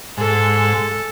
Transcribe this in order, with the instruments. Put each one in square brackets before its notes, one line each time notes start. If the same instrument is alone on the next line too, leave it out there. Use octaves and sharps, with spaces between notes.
[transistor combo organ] G#2 [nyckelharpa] A4